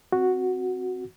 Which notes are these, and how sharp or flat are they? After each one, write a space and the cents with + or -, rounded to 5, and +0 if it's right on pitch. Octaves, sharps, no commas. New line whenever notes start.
C4 +0 F#4 +0